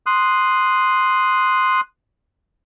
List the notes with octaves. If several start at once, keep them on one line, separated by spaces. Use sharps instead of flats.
C6 D#6 F#6